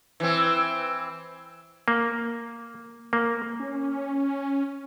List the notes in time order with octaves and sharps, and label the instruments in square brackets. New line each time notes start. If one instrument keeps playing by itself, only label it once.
[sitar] E3 C4
[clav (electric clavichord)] A#3
A#3
[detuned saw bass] C#4